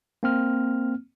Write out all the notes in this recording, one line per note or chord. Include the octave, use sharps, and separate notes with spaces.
A#3 C4 F6